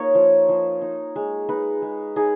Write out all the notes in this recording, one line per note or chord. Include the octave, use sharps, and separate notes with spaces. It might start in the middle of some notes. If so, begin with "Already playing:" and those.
Already playing: A#3 D#4 F4 C#5
F3
F3
D#4
G#3
D#4 B4
G#3
D#4 G#4